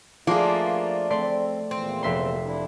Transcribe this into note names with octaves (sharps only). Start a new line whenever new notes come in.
F3 A3 A#3 D4 F4 G#4
A3 C4 D5 C6
E2 A#2 E3 C4
F1 E5 C6
D4 E4